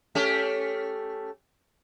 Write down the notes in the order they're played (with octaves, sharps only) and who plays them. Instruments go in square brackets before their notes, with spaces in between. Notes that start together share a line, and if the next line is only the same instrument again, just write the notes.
[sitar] A3 C#4 G4